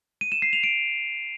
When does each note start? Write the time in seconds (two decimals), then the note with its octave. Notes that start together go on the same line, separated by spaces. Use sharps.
0.21 D#7
0.32 E7
0.42 C7
0.53 F7
0.63 D7